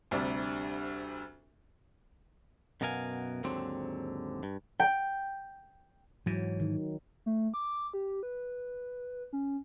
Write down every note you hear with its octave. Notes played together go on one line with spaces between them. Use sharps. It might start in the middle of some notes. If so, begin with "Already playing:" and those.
D2 C3 G3 D4
F#2 B2 B3 A#4 F5 G#5
D#2 G#2 D3 F#3 C4
G2
G5
G#2 E3 F#3
D#3
A3
D6
G4
B4
C#4